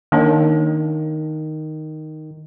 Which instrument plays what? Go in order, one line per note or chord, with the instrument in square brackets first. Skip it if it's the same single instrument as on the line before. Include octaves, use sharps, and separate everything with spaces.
[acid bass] D#3 [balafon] A#3 D4 C#5